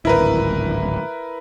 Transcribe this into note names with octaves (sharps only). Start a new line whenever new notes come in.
D1 G#1 E4 A#4 B4